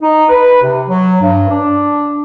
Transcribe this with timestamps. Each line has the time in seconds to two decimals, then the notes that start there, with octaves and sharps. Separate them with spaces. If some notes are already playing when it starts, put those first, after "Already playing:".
0.02 D#4
0.29 B4
0.62 C3
0.88 F#3
1.21 G2
1.49 D4